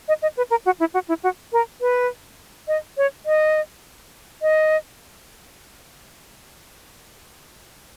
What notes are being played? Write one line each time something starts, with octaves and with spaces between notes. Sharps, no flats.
D#5
D#5
B4
A#4
F#4
E4
F#4
E4
F#4
A#4
B4
D#5
C#5
D#5
D#5